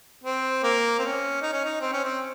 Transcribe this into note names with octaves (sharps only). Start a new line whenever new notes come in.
C4
A#3
C4
C#4
D#4
C#4
D#4
C4
C#4
C4